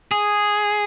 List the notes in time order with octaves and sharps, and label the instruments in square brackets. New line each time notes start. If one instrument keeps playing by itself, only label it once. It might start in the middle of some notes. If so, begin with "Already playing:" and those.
[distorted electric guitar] G#4